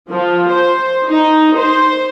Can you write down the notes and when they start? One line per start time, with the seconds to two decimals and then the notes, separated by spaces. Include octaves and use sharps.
0.10 F3
0.50 C5
1.10 D#4
1.58 C5